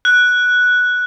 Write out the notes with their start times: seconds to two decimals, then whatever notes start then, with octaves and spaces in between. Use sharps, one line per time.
0.05 F#6